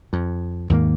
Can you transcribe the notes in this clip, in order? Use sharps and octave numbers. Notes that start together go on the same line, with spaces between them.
F2
D#2 G#2 D#3 A#3